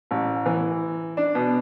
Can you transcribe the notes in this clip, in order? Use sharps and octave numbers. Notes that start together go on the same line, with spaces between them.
A1
E3
D4
B2